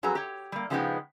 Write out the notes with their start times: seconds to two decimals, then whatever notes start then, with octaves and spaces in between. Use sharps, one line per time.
0.03 F2 F#3 G#4 B4 A#5
0.15 G4 C#5
0.52 G3 A#3
0.70 C#3 F3 G#3 B3 D#4 G4